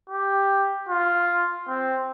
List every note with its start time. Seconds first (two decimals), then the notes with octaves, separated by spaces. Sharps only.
0.10 G4
0.89 F4
1.68 C4